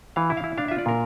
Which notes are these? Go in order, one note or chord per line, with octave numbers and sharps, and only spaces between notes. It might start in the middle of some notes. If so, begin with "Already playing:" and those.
E3 F5
E4
F5
E4
D4 F5
E5
F4
D5
A#2 A#4